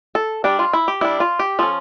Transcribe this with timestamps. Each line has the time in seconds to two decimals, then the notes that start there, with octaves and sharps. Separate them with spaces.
0.15 A4
0.44 G3 D4 G4
0.59 F4
0.73 E4
0.88 G4
1.01 G3 D4 E4
1.20 F4
1.39 G4
1.59 F3 C#4 A4